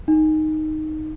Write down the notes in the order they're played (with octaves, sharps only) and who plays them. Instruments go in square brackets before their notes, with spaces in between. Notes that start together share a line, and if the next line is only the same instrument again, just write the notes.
[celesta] D#4